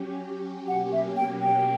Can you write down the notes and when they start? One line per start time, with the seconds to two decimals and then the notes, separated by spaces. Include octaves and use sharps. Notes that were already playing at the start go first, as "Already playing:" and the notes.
Already playing: F#3 C#4 G4
0.67 B2 F#3 A#3 C#4 G4 F#5
0.93 E5
1.17 G5
1.41 G5